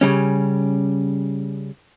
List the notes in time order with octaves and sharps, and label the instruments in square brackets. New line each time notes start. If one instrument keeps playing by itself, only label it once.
[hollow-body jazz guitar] C#3 G3 C#4